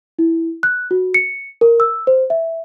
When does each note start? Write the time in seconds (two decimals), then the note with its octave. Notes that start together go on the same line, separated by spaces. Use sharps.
0.19 E4
0.63 F#6
0.91 F#4
1.14 C#7
1.61 A#4
1.80 E6
2.07 C5
2.30 E5